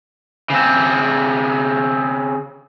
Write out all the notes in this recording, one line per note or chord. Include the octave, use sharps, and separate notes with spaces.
C#3 C4